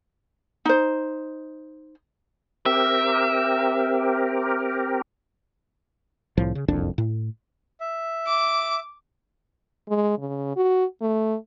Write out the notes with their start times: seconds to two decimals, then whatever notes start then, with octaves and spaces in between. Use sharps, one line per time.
0.65 D#4 C5
2.66 C4 G4 A#4 E5
6.37 C2 A2 F3
6.55 C#3
6.68 F#1 C2 F2 D4
6.98 A2
7.80 E5
8.28 D6
9.88 G#3
10.18 C#3
10.56 F#4
11.02 A3